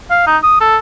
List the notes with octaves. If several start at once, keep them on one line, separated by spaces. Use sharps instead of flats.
F5
D#4
D#6
A4